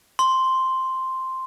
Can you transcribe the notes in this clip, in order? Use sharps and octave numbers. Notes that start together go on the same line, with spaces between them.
C6